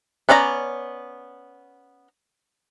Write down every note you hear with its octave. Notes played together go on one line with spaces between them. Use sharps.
B3 C#4 D5 D#5 A#5